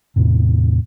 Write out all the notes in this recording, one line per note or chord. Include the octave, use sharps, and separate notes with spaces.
E2 A2 C3